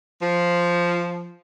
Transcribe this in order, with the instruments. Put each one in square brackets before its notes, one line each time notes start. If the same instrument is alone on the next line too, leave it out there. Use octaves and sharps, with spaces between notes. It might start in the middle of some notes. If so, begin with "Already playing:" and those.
[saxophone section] F3